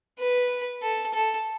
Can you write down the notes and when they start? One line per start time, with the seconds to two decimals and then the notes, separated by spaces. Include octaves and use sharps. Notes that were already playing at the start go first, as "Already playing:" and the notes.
0.19 B4
0.83 A4
1.14 A4